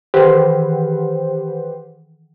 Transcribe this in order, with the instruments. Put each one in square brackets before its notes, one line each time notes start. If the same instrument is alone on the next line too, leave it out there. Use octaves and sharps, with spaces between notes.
[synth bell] D#3 E3 [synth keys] G4 B4 C5